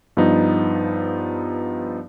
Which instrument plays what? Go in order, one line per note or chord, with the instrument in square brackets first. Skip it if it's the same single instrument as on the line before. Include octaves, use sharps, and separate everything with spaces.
[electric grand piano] G2 F3 B3 D#4